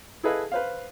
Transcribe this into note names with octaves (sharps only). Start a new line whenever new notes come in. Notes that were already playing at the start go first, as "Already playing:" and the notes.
E4 G#4 A4 B4 D#5 F5
B4 C5 F5